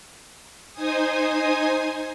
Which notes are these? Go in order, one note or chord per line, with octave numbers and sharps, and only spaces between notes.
D#4 C5 G#5 D#6